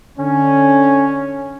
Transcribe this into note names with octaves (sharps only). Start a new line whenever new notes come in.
D3 C#4